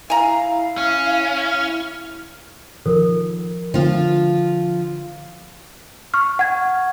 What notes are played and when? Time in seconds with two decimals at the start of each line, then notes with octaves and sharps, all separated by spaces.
0.10 E4 F5 G#5 A#5
0.77 C#4
2.86 D#3 F3 A4 A#4
3.74 D3 F3 F4
6.14 C#6 F6
6.39 F#5 G#6